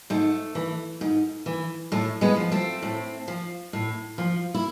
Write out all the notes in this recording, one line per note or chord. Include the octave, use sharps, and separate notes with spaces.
G#2 A3
E3
G#2
E3
A2 A3
G#3 B3
F3
A3 C4
A2
F3
A2
F3
E4